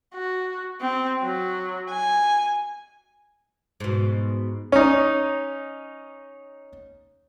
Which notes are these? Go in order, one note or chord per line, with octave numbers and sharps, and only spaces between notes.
F#4
C4
F#3
G#5
G#2 B2
C#4 D#4